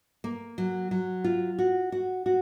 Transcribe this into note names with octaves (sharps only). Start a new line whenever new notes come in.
A#3
F#3
F#3
F4
F#4
F#4
F#4